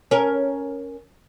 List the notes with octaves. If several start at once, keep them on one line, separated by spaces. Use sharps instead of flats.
C#4 A#4